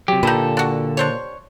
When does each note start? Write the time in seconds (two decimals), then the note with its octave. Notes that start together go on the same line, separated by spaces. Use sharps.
0.08 C3 F#3 G4
0.23 A#2 D3 D#4 A4 B4
0.57 D4 F#4
0.97 D4 C5 C#5